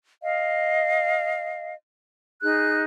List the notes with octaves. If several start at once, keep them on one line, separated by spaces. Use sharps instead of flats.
D#5 F5
D#4 G#4 F#6